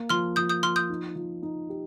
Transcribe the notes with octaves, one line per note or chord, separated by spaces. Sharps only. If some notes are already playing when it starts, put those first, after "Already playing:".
Already playing: A#3
F3 C6 F6
F3 D#6 G6
D#6 G6
F3 C6 F6
D#6 G6
D#4
F3
D#4
G4